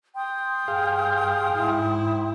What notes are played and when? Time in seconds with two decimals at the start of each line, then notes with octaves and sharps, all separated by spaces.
0.16 G5 C6 D#6
0.68 G2 G#4 F5
1.55 G#2 E4